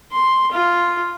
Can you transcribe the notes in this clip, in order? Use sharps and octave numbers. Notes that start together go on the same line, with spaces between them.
C6
F4